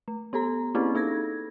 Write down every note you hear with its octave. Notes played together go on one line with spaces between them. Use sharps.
A3
B3 G4 A4 A#5
A#3 C4 C#4 E4 G4 G#4
A#3 D#4 A4 G#6 A#6